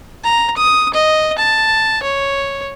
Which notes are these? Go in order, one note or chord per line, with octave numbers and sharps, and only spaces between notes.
A#5
D#6
D#5
A5
C#5